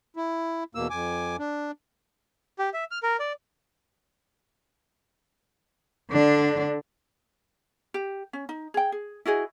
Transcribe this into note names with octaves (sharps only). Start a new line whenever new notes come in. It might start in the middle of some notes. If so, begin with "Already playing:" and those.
E4
E2 B2 A#3 E6
F2 G#5 D6
D4
G4
E5
F6
A#4
D5
D3 D4
G4
C#4
D#4
G#4 G5
G#4
E4 F#4 G#4 D#5